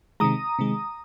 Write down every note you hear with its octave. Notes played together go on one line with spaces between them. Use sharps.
C3 D#3 G#3 A#5 D#6
C3 D#3 G#3